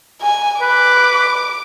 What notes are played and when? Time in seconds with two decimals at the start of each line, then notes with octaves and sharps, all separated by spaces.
0.22 G#5
0.61 B4 D6